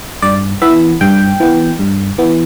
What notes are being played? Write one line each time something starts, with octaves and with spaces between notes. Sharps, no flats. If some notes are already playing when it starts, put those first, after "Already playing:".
G2 D5
E3 B3 E5
G2 G5
E3 B3
G2
E3 B3